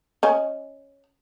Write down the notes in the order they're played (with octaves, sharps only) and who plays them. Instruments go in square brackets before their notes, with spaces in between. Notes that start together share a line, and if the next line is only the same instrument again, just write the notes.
[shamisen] C#4 D#5 G#5